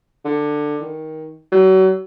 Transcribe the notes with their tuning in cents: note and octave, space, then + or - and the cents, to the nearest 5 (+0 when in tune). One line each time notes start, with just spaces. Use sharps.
D3 +15
D#3 +15
F#3 +35